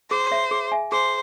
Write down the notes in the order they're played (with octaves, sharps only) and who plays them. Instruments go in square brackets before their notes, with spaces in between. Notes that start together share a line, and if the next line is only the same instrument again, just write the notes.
[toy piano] G#4 [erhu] C5
[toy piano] C#5 E5
G#4
E5 G#5
[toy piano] G#4 [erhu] C5